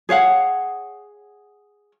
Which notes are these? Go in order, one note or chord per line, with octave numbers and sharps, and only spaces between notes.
G#4 C#5 F5 F#5